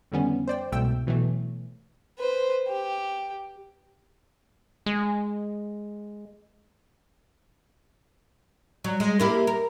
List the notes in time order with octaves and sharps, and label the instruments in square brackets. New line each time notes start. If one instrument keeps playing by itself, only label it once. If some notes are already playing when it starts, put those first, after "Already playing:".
[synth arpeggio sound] F2 D3 D#3 G3 B3 C#4
C5 D5 G5
C2 G#2 B2 A3 G5 E6
B2 E3 F#3 A3
[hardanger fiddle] B4 C5
G4
[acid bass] G#3
[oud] F#3
G#3
A#3 E4 G4
A#4